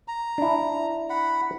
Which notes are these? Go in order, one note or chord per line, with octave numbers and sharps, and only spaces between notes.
A#5
D4 E4
F#5 B5